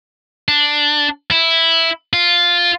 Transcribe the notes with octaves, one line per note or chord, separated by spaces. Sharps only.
D4
E4
F4